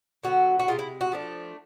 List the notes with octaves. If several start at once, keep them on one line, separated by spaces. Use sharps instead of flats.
D3 F#3 B3 F#4
F#4
C3 D#3 G#3 F4
E4
F#4
F3 A3 D4